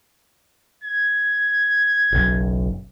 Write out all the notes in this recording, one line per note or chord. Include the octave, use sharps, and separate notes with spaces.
G#6
F#1 B1 F#2